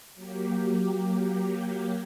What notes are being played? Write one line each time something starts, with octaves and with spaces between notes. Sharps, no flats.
F#3 A#3 G4